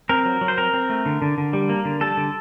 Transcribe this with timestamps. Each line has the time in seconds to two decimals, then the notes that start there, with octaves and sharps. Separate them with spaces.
0.09 C4 A#4
0.25 F#3
0.41 F#3
0.48 C5
0.58 C4 A#4
0.73 C4
0.90 A3
1.06 D3
1.22 D3
1.38 D3
1.53 G3
1.69 A#3
1.85 D3
2.01 G3 A4
2.17 D3